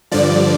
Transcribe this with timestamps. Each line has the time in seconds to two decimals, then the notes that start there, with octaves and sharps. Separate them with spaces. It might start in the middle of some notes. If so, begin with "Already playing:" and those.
0.12 G2 D3 F3 D5